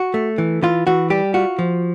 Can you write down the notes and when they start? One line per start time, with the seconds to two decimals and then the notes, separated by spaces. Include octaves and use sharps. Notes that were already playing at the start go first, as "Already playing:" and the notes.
Already playing: F#4
0.14 A3
0.38 E3
0.62 E3 F4
0.87 E3 F#4
1.10 G3 G4
1.34 F4 F#4
1.59 F3